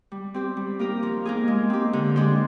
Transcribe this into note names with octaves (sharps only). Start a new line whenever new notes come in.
G3
C4 G4 C5
G3
A#3 D#4 G4 A#4
F3
A#3 D#4 G#4
G#3
C4 G4
D3
G#3 D4 G4 C5